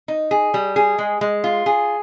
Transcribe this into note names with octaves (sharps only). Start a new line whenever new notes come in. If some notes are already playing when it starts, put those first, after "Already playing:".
D#4
G#4
G3
G#4
G#3
G#3
F4
G#4